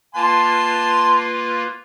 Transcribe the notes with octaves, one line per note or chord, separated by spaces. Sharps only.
A#3 F4 B4 A5 C6